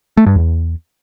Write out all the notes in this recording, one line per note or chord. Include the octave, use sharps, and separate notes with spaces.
A3
G2
E2